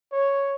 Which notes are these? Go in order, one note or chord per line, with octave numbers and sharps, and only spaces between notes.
C#5